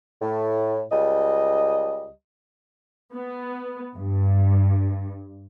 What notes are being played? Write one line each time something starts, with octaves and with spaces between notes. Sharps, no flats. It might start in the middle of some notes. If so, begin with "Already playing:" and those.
A2
C#2 G3 D#5
B3
G2